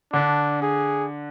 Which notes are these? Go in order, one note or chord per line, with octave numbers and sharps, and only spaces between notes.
D3 D4
G#4